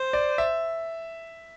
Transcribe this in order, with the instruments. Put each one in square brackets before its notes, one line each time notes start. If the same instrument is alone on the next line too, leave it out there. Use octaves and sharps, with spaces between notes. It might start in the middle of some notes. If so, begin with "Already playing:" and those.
Already playing: [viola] C5
[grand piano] D5
E5